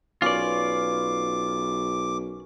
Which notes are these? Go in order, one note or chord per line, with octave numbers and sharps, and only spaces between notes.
B1 C#4 F4 A#4 B4 D5 D6